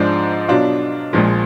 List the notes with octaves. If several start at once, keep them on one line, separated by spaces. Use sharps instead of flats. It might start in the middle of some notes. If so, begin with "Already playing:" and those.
Already playing: G#2 F3 G#3 D4
B2 F#3 D4 F4
A#1 A#2 F3 G#3